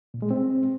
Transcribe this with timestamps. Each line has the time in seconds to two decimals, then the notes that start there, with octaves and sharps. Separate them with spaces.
0.14 A#2
0.22 G#3
0.31 C4